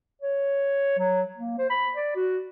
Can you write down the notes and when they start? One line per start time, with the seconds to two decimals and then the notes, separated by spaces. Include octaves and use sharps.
0.22 C#5
0.98 F#3
1.37 A#3
1.58 C5
1.70 B5
1.95 D5
2.16 F#4